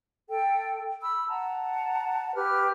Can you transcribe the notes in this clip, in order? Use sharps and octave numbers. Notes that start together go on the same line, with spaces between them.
A4 G5
B5 E6
F#5 A5 A#5
G4 B4 F6